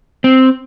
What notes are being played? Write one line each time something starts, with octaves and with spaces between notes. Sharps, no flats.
C4